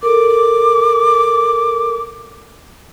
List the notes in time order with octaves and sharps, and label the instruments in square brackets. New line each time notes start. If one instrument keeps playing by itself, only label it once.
[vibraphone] A4 A#4 [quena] D6